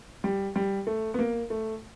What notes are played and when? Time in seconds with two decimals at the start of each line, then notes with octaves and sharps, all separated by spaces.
0.24 G3
0.56 G3
0.87 A3
1.14 B3
1.19 A#3
1.50 A3